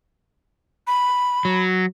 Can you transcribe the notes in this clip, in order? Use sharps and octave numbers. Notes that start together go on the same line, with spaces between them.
B5
F#3